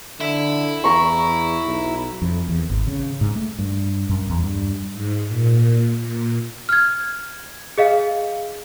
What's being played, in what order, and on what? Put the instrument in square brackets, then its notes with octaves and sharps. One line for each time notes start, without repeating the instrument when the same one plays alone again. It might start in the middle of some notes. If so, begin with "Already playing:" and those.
[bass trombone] D3 [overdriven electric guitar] E4
[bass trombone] E2 [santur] F5 A#5 C#6
[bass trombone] B1
[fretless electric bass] F2
E2
G#1
C#3
G#2
A3
G2
F#2
E2
G2
[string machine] G#2
A#2
A#2
[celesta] F6 G#6
G#4 D#5 F5